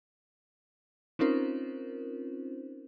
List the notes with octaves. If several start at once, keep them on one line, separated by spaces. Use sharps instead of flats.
C4 C#4 D#4 F4 A#4 C5